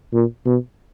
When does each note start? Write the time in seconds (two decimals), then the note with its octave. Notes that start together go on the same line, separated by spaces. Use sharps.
0.13 A#2
0.46 B2